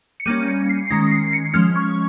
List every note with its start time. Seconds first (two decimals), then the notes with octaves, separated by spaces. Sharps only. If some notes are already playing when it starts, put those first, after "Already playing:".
0.20 C#7
0.26 G3 A#3 C#4 D#7
0.48 C#7
0.69 C7
0.90 D#3 G#3 C#4 A#6
1.11 C7
1.33 C#7
1.54 F3 G#3 C#4 F6
1.76 C#6